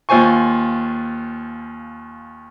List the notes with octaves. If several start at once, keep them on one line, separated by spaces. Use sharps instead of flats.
D#2 F4 C5 G#5 C#6